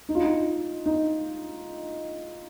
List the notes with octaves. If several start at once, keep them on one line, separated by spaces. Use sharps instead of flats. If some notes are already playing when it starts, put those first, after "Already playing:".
D#4
F4
D#4
D#4